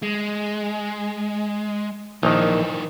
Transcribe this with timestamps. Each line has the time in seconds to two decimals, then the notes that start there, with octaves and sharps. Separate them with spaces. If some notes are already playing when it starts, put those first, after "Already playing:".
0.03 G#3
2.23 A#1 D#3 E3 D#4